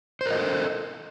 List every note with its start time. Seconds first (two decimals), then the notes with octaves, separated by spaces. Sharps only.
0.21 C5
0.26 A#4
0.31 D#5
0.36 A4